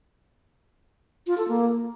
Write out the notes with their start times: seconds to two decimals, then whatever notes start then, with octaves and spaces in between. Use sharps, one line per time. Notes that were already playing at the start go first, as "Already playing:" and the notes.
1.27 F4
1.37 A4
1.48 A#3